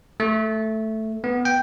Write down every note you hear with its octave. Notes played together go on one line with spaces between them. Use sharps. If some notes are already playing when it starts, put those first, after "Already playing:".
A3
B3
G5